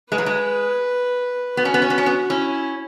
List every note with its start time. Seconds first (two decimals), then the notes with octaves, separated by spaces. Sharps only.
0.12 G#3 B4
0.18 F#3
0.26 G#3
1.57 B3 F#4
1.65 C#4
1.74 B3
1.82 C#4
1.90 B3
1.98 C#4
2.06 B3
2.30 C#4 E4